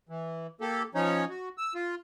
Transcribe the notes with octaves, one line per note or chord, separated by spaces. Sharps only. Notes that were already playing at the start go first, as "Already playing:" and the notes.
E3
A#3 G4 A4
F3 C#4 D#4 C#5
F#4
E6
F4